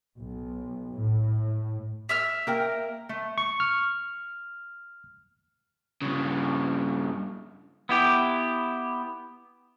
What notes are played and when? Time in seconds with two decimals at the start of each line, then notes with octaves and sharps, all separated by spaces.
0.19 B1
0.95 A2
2.09 E5 E6 F6
2.47 A#3 A#4 G5
3.09 A3
3.38 C#6
3.60 F6
6.02 G2 C#3
7.89 B3 E4 G4